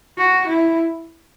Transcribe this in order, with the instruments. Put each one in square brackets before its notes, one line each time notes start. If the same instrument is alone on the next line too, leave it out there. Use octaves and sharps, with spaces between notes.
[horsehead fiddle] F#4
E4